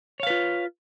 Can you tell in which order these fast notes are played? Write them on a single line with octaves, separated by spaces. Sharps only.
C#5 F5 B4 F4